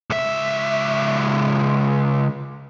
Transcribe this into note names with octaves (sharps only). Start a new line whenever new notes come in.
C#2 E5